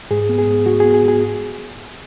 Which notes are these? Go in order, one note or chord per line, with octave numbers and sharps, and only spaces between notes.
G#2 G#4
B3
G#4
G#2
G#2 F#4
G#4
B3
G#4
G#2
G#4